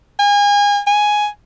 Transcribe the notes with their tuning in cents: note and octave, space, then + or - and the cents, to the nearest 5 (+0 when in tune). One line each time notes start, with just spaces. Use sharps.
G#5 -30
G#5 +5